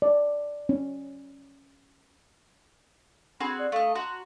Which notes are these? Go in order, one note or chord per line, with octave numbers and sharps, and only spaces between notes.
D5
C#4
C4 F#4 G#4 B5
D5
A3 D#5 F5
F#4 A#5 C6